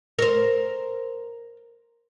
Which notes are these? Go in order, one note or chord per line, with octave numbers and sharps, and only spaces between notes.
A#4 C5